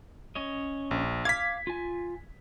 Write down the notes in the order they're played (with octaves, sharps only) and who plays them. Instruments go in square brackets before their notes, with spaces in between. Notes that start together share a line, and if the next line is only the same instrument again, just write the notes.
[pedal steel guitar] C#4 C#5 D#5
[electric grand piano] A#1
[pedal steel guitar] F5 D6 F6 [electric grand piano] G#6 B6
[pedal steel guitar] F4 G#5